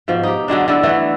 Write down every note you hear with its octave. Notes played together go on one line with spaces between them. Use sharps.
G#2 B2 F3
D#4 G4
D3 F#3 G#3 D4
D3 E4 A4
E3 A3 B3